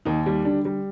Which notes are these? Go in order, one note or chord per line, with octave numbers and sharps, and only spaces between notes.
D#2 D#4
G3
D3 D4
G3